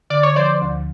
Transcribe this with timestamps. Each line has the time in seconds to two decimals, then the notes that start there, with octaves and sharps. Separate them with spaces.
0.10 D3 D5
0.23 C#5
0.36 F3 C5 D5
0.62 D2